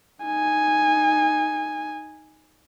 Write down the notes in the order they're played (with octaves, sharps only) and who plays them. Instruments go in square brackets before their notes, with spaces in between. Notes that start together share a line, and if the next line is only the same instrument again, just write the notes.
[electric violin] D#4 G#5